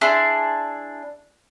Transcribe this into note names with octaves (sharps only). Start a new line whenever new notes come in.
D4 E4 G#4 C6